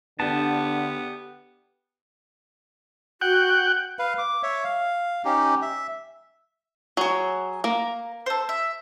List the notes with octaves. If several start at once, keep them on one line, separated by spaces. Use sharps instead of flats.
D3 B3 D4 G4 A5
F#4 F#5 G5
B4 F5
D6
C#5 E5
F5
C#4 D#4 G4
E5
F#3 F#4 G#4 C#5
A#3 A#4
A4 C5
E5